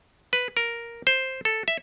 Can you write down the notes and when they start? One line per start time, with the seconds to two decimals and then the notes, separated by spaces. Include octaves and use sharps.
0.33 B4
0.57 A#4
1.07 C5
1.45 A4
1.68 E5